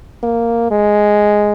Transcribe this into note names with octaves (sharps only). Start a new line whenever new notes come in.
A#3
G#3